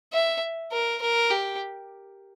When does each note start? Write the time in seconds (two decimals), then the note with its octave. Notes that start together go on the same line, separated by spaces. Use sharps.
0.13 E5
0.72 A#4
1.02 A#4
1.30 G4